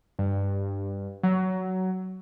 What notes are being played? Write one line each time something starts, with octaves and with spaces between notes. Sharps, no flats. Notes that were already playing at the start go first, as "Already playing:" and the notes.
G2
F#3